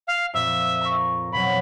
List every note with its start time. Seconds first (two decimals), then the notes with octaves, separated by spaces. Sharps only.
0.07 F5
0.33 F2 A#2 E5
0.81 A#5 C#6
1.32 F2 B2 F#3 B5